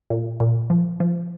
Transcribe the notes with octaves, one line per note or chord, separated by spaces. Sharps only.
A#2
A#2
F3
F3